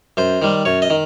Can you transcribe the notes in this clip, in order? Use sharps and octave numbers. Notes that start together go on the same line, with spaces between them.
F#2 C5
D#3 G3
F#2 C#5
D#5
D#3